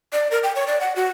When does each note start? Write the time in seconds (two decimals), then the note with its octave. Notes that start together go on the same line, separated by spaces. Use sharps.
0.13 D5
0.31 A#4
0.43 G5
0.56 C#5
0.67 D5
0.80 F#5
0.96 F#4